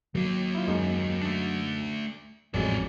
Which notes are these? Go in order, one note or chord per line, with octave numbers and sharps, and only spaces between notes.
D#2 F#3 A#3
E4 F4
F#2 G#3 D#4
A3 D4
A1 F2 F#3 G#3 C#4 D5